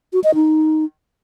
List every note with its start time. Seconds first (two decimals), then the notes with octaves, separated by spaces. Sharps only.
0.13 F#4
0.24 D#5
0.35 D#4